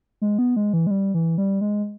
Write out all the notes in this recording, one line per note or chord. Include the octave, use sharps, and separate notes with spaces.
G#3
B3
G#3
E3
G#3
G3
E3
G3
G#3